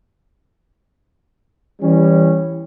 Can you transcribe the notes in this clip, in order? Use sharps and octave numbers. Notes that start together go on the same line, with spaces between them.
E3 G3 C#4